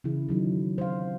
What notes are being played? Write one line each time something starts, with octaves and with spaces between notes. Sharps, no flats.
C#3 E3 E4
D#3 F#3 D#4
C5 F5